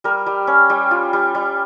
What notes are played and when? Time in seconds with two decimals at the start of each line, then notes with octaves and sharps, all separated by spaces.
0.04 G3 A#4
0.26 G3
0.47 C#4
0.70 G3
0.91 F4
1.13 G3
1.35 G3